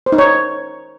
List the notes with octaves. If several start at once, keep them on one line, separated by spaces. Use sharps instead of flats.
C5
D#4
C#5